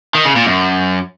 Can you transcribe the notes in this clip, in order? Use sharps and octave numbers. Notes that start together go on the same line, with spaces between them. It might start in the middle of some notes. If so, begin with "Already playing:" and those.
D#3
C#3
A#2
F#2